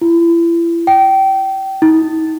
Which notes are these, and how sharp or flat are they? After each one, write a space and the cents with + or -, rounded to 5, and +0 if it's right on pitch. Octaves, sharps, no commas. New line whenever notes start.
E4 +35
G5 -25
D#4 +40